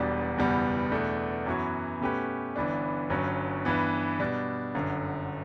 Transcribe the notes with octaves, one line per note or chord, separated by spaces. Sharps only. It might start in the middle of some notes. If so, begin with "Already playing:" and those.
Already playing: E1 E2 B2 G3 D4
F#1 E2 B2 G3 B3
E2 B2 A3 D4
F#2 E3 B3 F#4 C#5
B2 A3 C#4 G4 B4
G1 G2 E3 B3 D4
G1 G2 F#3 C#4
G2 E3 B3
B2 G3 D4
G1 F#2 D3